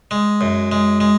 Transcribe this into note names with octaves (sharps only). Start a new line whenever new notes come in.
G#3
F#2
G#3
G#3